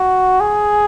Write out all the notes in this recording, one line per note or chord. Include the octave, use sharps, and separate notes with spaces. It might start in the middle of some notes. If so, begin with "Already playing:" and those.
Already playing: F#4
G#4